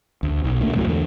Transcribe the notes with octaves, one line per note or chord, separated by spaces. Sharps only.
D2
B1
D2 A#2 A3
C2 F2 A2 F#3
E2 D3 F#3 A3